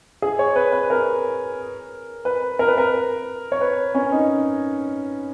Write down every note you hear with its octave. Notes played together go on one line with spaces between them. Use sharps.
G#4
C#5
B4
B4
A#4
B4
A#4
B4
A#4
C#5
B4
C#4
D#4